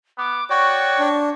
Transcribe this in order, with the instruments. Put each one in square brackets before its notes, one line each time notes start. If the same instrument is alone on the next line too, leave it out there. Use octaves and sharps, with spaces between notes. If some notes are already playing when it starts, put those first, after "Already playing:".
[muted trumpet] B3 [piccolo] D6
[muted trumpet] F#4 [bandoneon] C#5 D5 G5 [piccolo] C#6
[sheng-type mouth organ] D4